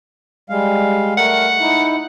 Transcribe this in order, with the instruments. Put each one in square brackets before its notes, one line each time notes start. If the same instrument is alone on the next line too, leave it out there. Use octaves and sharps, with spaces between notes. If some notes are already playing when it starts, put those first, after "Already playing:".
[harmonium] G3 G#3 F5
[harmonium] A3 A#4 [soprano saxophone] F#5
[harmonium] D#4 E4